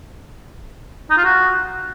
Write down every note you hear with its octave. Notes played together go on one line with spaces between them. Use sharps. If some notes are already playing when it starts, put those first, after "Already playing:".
D#4
F4
F#4